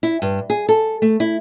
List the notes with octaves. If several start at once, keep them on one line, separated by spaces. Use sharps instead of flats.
E4
G2
G#4
A4
A3
E4